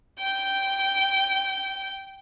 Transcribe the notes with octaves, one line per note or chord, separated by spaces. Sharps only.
G5 G6